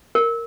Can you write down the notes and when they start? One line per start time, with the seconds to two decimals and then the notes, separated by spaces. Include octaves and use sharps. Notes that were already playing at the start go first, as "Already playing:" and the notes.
0.15 A#4